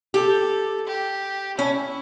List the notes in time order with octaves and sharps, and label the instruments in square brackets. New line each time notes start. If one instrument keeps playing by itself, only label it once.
[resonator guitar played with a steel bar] G4 [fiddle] A4
[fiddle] G4
[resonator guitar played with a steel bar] C#4 [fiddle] E4